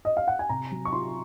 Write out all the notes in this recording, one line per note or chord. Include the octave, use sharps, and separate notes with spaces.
D#5
F5
F#5
G#5
C3 A#5
F#3
C#6
F4 C6